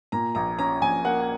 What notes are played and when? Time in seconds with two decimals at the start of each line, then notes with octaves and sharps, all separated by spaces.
0.12 A#2 A#5
0.35 A#1 A#5
0.59 C#4 A#5
0.81 A#1 G#5
1.04 A#3 F#5